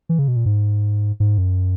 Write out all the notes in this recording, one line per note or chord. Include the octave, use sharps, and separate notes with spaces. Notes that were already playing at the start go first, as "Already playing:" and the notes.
E3
C#3
B2
A#2
G#2
G#2
F#2